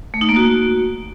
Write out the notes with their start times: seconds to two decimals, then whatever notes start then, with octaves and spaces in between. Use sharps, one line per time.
0.14 A3
0.21 D#4
0.29 A#3
0.36 F#4